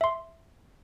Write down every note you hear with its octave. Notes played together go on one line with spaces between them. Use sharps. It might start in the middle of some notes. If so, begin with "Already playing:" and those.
E5 C6